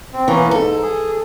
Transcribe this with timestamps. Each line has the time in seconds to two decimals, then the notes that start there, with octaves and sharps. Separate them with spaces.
0.13 C4
0.28 E3 A#3 B3 C#4
0.51 G#2 A4
0.83 G#4